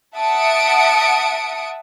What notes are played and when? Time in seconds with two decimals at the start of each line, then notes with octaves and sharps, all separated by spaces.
0.16 E5 F#5 A5 D#6 C#7 D7